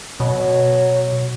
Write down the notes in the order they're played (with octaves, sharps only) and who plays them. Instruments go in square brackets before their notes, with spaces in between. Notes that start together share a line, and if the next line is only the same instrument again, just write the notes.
[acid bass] B2 [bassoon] F#3